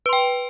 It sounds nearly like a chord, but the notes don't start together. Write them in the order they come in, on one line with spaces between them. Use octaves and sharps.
B4 C6 G5